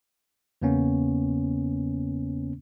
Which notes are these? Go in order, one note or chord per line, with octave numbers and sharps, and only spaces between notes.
E2 C#3 A#3 B3 C#4